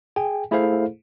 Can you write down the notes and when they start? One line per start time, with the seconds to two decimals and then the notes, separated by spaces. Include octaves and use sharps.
0.16 G#4 G5 G#5
0.51 A3 E4 G#4 A4 C5 F5